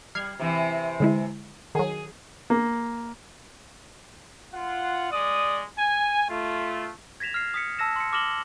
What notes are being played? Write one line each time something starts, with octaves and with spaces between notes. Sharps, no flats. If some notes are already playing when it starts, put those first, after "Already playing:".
G3 F6 G#6 C7
C3 E3 C4
D3 G#3 E4
D#3 F#3 G#4
A#3
F4 F#5
G#3 D5 D#6
G#5
A3 F4
G#6 A#6 B6 E7 F7
F6 C7
D#6 B6 C#7
A5 E6 A#6 E7
C6 C#7
D6 F6 A#6 E7 F#7 G7